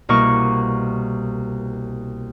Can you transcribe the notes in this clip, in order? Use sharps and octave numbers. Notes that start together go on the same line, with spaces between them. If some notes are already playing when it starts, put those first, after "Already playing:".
C2 B2 A#3 C#6 C#7